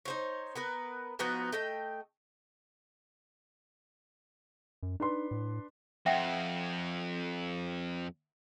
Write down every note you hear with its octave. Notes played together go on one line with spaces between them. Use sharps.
D#4 C5 C#5
B3 A#4 B4
F3 B3 D#4 F#4
A3 D#5 G5
F#2
D4 D#4 B4 C6
A2
F2 E5 F#5 G5